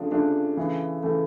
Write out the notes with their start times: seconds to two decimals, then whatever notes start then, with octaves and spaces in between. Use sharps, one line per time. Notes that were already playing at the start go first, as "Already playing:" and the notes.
Already playing: C#3 F3 A3 D4
0.11 C#3 F3 A3 D4
0.57 C#3 E3 A3
1.03 C#3 E3 A3